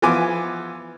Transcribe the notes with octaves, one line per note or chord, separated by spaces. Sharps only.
E3 F3 B3 G#5 D6